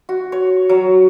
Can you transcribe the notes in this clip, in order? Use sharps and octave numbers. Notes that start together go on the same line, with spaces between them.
F#4
C#5
F#3